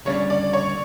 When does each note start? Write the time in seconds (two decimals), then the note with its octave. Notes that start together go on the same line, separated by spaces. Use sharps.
0.05 D2 C#3 G3 D4 C#5
0.30 D5
0.53 C#5